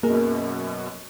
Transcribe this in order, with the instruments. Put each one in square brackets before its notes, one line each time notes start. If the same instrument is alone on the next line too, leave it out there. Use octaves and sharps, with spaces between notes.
[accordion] F#2 B2 [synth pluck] A#3 G#4 [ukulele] A#4